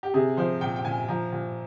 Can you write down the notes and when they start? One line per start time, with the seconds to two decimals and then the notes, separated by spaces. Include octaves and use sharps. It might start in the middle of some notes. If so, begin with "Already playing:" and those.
0.03 G4
0.14 C3 G#4
0.37 F3 C5
0.61 A#2 G5
0.76 G5
0.85 A#2 G#5
1.08 F3 A#5
1.32 A#2